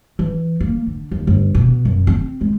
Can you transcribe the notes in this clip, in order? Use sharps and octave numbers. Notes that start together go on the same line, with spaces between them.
E3
A#3
D3
D#2
G1
B2
F#2
C4
G#3